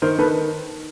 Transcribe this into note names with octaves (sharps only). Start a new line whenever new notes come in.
D#3 A#4 C5
D#3 A4 B4